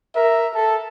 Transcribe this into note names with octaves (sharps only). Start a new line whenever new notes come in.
A#4 E5
A4